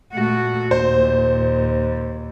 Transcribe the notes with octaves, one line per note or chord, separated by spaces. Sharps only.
A#2 A3 F#4
D#2 C5